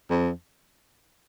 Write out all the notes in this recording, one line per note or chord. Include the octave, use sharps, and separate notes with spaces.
F2